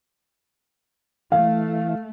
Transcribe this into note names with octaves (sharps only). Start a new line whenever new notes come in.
E3 A3 F5